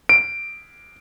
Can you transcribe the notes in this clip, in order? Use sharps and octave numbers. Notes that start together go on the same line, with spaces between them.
D7